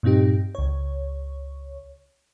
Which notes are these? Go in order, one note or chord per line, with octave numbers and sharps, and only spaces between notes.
G2 A#2 C4 D#4 G4
C#2 C#5